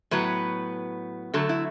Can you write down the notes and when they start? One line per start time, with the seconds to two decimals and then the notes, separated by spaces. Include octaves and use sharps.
0.11 A2 F#3 B3 B4
1.34 D3 F#3 A3 A4
1.49 E4